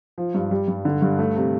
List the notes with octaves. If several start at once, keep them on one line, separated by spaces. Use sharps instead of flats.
F3
G2
G3
G2
D3
G2
A3
C3